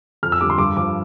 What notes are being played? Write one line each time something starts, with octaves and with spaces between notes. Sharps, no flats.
F2 F6
E6
D3 G3 D6
C6
G2 D6
F3 D6